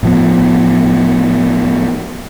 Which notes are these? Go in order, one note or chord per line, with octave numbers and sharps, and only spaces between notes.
A2 F3 B3